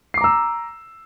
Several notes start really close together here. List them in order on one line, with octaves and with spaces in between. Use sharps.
C7 D6 A#5 E6